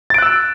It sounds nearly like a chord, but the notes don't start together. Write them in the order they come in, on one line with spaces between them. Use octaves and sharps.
A6 D7 F#6 E6